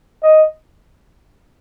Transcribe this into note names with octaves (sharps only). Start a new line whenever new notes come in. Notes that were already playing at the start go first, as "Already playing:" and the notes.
D#5